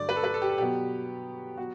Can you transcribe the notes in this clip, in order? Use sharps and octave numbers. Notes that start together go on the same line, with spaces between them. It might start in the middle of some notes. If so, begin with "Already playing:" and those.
Already playing: G2 D3 F#3 A3 D5
B4
A4
B4
A4
G4
A4
B2 F#3 B3 G4
F#3 B3 F#4